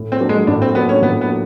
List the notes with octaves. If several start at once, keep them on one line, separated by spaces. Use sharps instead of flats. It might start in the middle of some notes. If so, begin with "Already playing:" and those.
Already playing: A2
C4
F#3 A#3 D4
G#3
A2 D4
C4
F#3 A#3 B3 D4
C#4
A2 B3
B3
F#3